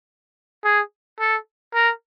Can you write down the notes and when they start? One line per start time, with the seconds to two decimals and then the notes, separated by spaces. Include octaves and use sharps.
0.64 G#4
1.20 A4
1.74 A#4